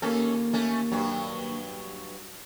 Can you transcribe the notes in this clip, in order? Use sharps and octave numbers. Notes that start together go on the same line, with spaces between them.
D#2 A#3 C#4 A4
A3 C#4
G2 F#3